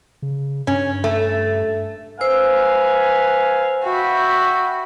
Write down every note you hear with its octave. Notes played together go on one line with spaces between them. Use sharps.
C#3
G2 C#4
A3
B4 C5 F5 G#5 E6
F#4 E5 G5 B5